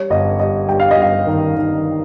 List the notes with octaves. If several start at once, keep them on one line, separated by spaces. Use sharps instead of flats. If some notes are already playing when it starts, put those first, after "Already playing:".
Already playing: G3 C#5
G1 D#5
G3 D#5
G2 G5
F5
D#5
G1 F5
D#3
D#3